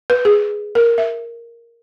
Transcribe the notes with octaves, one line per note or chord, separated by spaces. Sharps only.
B4
G#4
A#4
E5